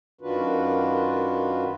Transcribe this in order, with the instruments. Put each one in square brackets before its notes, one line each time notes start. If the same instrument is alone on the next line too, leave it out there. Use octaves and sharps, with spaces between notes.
[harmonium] F#2 D#3 D4 F4 F#4 B4